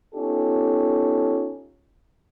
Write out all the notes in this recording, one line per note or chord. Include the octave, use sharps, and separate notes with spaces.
B3 C#4 D#4 F4 G4 A4